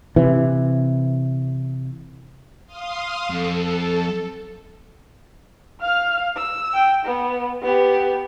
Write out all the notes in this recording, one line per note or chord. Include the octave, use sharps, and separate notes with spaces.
C3 E3
F5 C6 D#6
F2 A4
F5 F6
E6
G5
B3
B3 G4